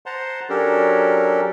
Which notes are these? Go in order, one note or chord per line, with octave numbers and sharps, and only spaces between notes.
C5 F#5 A5 A#5 C6
F#3 C#4 D4 G4 A4 A#4